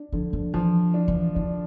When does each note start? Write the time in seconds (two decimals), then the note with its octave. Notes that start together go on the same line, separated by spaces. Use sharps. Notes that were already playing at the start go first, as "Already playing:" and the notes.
Already playing: D4
0.12 D3 F3
0.33 F3
0.54 E3 F3
0.94 D4
1.08 E3
1.35 D#3 D4